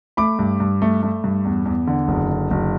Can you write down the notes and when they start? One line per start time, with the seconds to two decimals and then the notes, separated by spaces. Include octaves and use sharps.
0.17 A3 B5 D6
0.39 G2
0.60 G2
0.82 A3
1.03 A3
1.24 G2
1.45 E2
1.65 E2
1.87 D3
2.08 F#1
2.29 D3
2.51 F#1